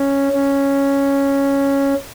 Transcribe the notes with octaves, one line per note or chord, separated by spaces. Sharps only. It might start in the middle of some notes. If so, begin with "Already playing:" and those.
Already playing: C#4
C#4